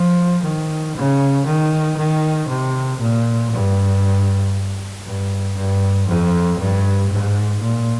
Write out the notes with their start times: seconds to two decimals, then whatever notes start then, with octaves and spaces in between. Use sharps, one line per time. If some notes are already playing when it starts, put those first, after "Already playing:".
Already playing: F3
0.43 D#3
0.95 C#3
1.46 D#3
1.97 D#3
2.48 C3
2.99 A#2
3.51 G2
5.05 G2
5.56 G2
6.07 F2
6.59 G2
7.09 G#2
7.61 A#2